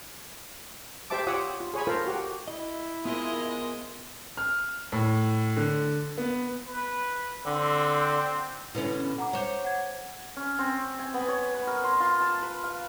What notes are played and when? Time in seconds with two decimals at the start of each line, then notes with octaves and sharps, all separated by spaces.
1.10 G4 C5 E5 A5 D6
1.27 F4 G4 C#5 F#5 D#6 E6
1.60 F4
1.74 G#4 C#5 G#5 B5
1.87 F4 A4 A#4 C5
2.06 F#4 G4
2.48 E4 D#5
3.05 G#3 B3 F4 A#4 C5 D#5
4.37 F6
4.92 A2
5.57 D3
6.18 B3
6.67 B4
7.46 D3 C4
8.75 B2 D3 C#4 E4 B4
9.18 F#5 A#5 D6
9.33 C5 C#5
9.65 F#5 G#6
10.36 C#4
10.58 C4
10.99 G#5
11.14 B3
11.28 C#5
11.54 B4
11.67 A#4
11.84 C6
12.00 F4
12.20 A5
12.42 B4
12.63 F5